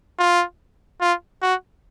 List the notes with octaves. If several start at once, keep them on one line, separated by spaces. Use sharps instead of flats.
F4
F4
F#4